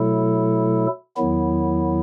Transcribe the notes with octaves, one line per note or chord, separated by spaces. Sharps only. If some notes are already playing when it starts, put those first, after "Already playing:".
Already playing: B2 F#3 A3 E4 A4
E2 D#3 F#3 B3 E4